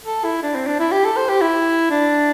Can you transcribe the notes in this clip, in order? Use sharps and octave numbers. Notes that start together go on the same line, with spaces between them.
A4
E4
D4
C4
D4
E4
G4
A4
C5
G4
E4
D4